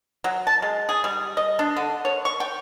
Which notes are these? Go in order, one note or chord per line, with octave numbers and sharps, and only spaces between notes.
F#3
A5
G#3
G#4
G3
D#5
D4
D3
C#5
C#6
G5